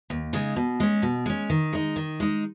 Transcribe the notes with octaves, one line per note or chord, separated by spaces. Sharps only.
D#2
C#3 G#3 D#4
B2
G#3 C#4
B2
G#3 C#4
D#3
G#3 D#4
D#3
G#3 D#4